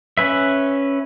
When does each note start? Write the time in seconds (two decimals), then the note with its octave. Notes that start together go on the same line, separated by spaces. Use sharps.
0.17 C#4 B4 E5